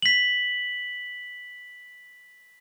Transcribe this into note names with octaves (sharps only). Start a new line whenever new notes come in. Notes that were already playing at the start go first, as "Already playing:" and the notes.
B6 F#7